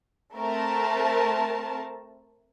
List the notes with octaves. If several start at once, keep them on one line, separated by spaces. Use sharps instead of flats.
A3 C4 A#4 A5